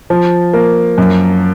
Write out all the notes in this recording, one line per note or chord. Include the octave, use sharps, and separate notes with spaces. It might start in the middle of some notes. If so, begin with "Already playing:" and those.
F3
A#3
F#2